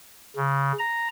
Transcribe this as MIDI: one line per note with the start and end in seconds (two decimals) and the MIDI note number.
0.36 0.72 49
0.79 1.08 82